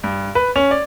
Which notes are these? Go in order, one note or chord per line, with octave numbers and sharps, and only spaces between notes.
G2
B4
C#4
D5